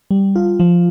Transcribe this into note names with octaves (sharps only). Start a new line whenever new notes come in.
G3
F4
F3